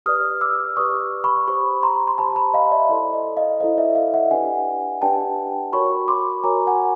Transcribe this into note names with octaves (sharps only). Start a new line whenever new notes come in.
G4 B4 D5 D#6 F6
D6 E6
G4 B4 D5 C#6 D#6
B5 C#6
G4 C5 B5 C#6
A#5 C6
C6
G4 C5 A5 B5
A5 B5
D#5 F5
D5 E5
E4 A4 C5 D5
D#5
D#5 F5
E4 A4 C5 D#5 F5
D5 E5
D#5 F5
E5 F#5
D4 G4 B4 D5 F#5 G#5
D4 G4 B4 D5 G5 A5
F#4 A#4 C#5 B5 C#6
C6 D6
F#4 A#4 C#5 G#5 A#5
F#5 G#5